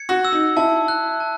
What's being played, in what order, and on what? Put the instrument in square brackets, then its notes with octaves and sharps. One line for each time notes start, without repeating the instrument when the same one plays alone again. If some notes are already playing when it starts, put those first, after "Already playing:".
Already playing: [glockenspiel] G#6 C#7
[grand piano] F#4
[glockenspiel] E6
[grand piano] D#4
[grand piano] E4 [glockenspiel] A5
[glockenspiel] F#6
A5